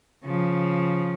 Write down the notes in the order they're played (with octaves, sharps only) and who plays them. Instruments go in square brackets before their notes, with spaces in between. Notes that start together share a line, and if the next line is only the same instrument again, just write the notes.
[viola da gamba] C#3 F3